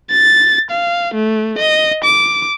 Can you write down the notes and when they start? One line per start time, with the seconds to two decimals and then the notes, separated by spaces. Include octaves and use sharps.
0.11 A6
0.71 F5
1.14 A3
1.58 D#5
2.04 D6